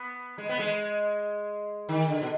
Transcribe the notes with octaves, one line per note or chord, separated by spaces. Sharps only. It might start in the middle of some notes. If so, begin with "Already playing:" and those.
Already playing: B3
G#3
B3
G#3
D#3
D3
B2